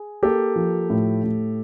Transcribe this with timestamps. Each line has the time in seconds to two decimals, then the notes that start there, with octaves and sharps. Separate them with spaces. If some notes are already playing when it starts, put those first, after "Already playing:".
Already playing: G#4
0.23 A#3 G4 A4
0.56 F3
0.90 A2
1.24 A2